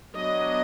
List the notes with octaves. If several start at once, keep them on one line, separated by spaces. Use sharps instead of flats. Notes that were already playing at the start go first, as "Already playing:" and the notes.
F#3 B3 D4 D#5